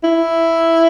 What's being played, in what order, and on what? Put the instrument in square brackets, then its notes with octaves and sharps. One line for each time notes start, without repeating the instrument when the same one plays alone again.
[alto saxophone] E4